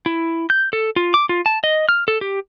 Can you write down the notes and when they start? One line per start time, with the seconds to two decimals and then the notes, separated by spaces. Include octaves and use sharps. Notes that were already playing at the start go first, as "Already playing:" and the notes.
0.06 E4
0.50 G6
0.73 A4
0.96 F4
1.14 D6
1.29 F4
1.46 A5
1.64 D#5
1.89 F6
2.08 A4
2.21 G4